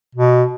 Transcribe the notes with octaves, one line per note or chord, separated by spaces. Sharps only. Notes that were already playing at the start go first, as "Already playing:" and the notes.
B2